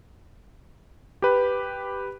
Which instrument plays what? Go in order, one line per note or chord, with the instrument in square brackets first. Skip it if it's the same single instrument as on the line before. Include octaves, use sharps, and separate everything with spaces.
[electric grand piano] G4 B4